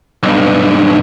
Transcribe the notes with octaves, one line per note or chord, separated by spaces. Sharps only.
B1 G2